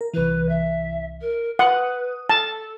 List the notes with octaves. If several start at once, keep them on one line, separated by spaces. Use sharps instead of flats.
A#4
C2 E3 B4
E5
A#4
B4 F#5 D#6
A4 A5